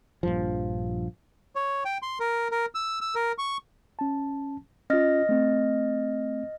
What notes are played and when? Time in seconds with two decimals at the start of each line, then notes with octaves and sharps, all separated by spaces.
0.23 A#1 G2 F3
1.56 C#5
1.85 G5
2.02 C6
2.20 A#4
2.52 A#4
2.75 E6
3.01 E6
3.15 A#4
3.38 C#6
3.99 C#4 A5
4.90 C#4 F4 D#5 F6 A#6
5.29 A3 C4